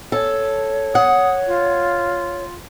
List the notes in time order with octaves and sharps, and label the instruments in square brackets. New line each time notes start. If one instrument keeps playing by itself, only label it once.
[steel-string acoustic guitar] A4 [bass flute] C#5
[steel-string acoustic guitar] F#5 [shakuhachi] D#6
[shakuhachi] F4